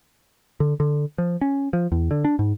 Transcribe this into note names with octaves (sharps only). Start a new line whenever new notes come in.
D3
D3
F3
C#4
F3
E2
D3
D4
G#2